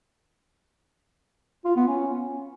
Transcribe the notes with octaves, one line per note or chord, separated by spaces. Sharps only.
F4
B3
C#4